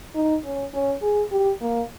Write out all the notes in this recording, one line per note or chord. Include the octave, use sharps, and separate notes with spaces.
D#4
C#4
C#4
G#4
G4
A#3